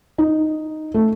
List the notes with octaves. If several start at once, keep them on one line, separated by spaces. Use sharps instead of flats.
D#4
A3